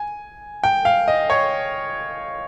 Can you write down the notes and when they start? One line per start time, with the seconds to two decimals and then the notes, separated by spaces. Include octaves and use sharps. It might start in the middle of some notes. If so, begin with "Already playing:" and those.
Already playing: G#5
0.64 G5
0.85 F5
1.08 D#5
1.30 C#5